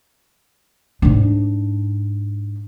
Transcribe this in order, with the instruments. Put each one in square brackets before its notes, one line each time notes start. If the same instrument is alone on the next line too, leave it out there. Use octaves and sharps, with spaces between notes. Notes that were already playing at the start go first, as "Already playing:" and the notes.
[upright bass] G#2 D4